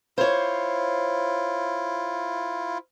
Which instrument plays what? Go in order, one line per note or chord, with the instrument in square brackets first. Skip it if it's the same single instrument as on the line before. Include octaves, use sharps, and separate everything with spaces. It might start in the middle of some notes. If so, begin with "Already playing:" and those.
[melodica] E4 F4 [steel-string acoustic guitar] C5 C#5